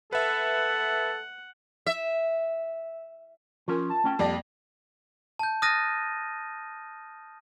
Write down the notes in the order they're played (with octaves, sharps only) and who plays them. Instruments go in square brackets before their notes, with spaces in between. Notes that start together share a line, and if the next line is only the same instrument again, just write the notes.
[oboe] A4 [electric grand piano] B4 E5 [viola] F#5
[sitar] E5
[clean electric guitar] F3 C#4 [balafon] F4 A#4 G#5
[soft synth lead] A5
[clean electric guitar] A3 C#4 G5
[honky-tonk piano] F2 D5 A#6 [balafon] G3 A#3 G5 [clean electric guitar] G4
[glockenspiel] A5 G6
D#6 F6 F#6 A6 A#6 D#7